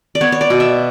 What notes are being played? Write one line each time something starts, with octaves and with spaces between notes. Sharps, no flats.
D5
B3 C#5
C#5
D5
B2
E5